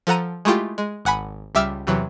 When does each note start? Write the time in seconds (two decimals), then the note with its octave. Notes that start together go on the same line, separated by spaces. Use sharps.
0.07 F3 A4 F#5 A#5 D#7
0.45 G#3 A3 E4 F4 G4
0.78 G#3
1.05 G#1 F#5 G#5 B5
1.55 C#2 G3 E5 D6 E6 F6
1.87 E2 C3 E3 F#3